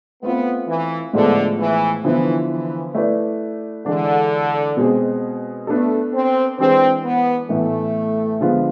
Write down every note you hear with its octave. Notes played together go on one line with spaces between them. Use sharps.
A3 B3 C4 F4 B4
E3
A2 D3 F3 G#3 B3
E3
D3 E3 F3 B3 E4
E3
A3 E4 B4 D5
D3 E3 G#3 D4
B2 G#3 C4 G#4
A3 B3 D4 A4
C4
E3 G#3 C4 D4 G#4 B4
B3
A2 E3 A3 B3
D3 F3 G#3 B3 F4